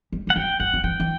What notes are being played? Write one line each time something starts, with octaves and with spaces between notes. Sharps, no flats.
G3
G3 F#5
F#3 G5
F#3 F#5
F#3
E3 G5
E3